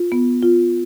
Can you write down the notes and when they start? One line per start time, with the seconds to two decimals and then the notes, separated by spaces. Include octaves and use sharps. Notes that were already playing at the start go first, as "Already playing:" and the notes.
Already playing: F4
0.12 B3
0.42 F4